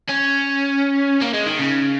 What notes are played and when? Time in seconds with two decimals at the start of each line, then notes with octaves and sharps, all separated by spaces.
0.09 C#4
1.21 A#3
1.34 G#3
1.46 D#3
1.59 C#3